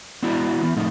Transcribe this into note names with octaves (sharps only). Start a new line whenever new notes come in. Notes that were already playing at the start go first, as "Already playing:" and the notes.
B3 D4 E4 F#4
E3 B3
A2 F3 A3 D#4